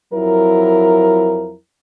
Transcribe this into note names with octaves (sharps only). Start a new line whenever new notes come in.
F2 F#3 E4 A#4